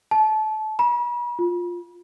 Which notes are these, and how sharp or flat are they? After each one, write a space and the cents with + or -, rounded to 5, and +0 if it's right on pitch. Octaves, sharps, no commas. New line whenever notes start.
A5 -25
B5 -40
F4 +10